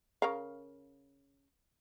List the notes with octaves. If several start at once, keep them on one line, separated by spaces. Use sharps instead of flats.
C#3 A#4 F5